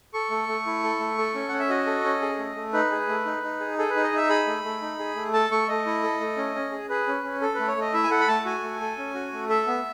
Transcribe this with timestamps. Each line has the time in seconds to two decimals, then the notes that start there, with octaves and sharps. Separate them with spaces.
0.14 A4 C#6
0.30 A3
0.49 A3
0.66 E4
0.83 A4
1.00 A3
1.18 A4
1.35 C#4
1.49 C#4 F#5
1.59 E5
1.69 F#4 D#5
1.86 A4
2.04 C#4
2.22 G#4
2.39 A3
2.56 A3
2.73 D#4 B4
2.91 G#4
3.09 A3
3.25 D#4
3.43 D#4
3.60 G#4
3.78 G#4 A4
3.90 B4
3.96 D#4
4.04 D#5
4.13 D#4 E5
4.29 G#4 B5
4.47 A3
4.64 A3
4.82 D#4
4.99 G#4
5.16 A3
5.33 A4 A5
5.51 A3 C#6
5.68 A3 D#5
5.86 E4
6.03 A4
6.21 A3
6.37 C#4
6.55 C#4
6.72 G#4
6.89 G#4 B4
7.07 C#4
7.24 C#4
7.41 A4
7.55 A3 B4
7.68 C#5
7.77 A3 D#5
7.93 E4 E5
8.03 G#5
8.11 A4 F#5
8.20 B5
8.28 A3 A5
8.45 F#4 G#5
8.64 A3
8.81 A4
8.98 C#4
9.14 F#4
9.33 A3
9.49 A4 E5
9.67 B3